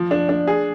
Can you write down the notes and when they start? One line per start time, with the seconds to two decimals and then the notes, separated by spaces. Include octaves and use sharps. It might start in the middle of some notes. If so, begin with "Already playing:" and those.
Already playing: F3
0.11 D4
0.29 D4
0.48 G#4